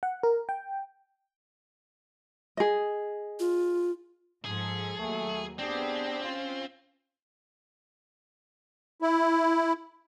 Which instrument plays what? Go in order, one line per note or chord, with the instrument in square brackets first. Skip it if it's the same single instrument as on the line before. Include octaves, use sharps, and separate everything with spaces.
[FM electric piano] F#5
A#4
G5
[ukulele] G#4 D#5
[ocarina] F4
[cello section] G#2 F3 A4 [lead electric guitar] G#4
[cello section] D#2 F#3 [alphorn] A3
[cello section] B3 G4 G#4 [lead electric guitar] C4 [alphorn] D4
[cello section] C#4 F4
[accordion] E4